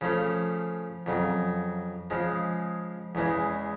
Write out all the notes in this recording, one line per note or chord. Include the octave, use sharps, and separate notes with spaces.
C#3 F3 A3 C#4
F2 C#3 F#3
C#3 F3 G#3
E2 C#3 E3 G#3